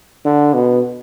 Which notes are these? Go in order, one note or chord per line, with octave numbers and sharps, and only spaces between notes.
D3
B2